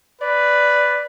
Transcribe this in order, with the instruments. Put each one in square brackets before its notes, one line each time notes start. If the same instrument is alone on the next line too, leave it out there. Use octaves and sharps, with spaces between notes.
[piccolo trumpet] B4 [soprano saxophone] D5